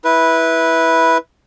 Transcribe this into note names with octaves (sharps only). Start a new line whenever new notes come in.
E4 B4